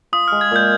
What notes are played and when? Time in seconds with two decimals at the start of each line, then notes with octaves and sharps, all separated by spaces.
0.13 F4 D#6
0.28 G#3 F6
0.41 G#6
0.51 A#2 G6